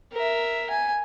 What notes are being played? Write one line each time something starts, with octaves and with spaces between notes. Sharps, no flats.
A#4 E5
G#5